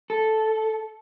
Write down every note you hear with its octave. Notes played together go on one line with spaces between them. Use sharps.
A4